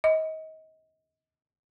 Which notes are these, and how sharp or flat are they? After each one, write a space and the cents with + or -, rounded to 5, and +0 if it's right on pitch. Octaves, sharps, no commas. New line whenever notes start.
D#5 +30